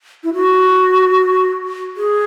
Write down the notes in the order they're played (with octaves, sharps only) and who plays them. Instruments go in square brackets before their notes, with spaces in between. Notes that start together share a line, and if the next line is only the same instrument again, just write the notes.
[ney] E4
F#4
G#4